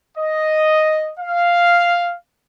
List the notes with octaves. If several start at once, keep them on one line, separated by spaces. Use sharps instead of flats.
D#5
F5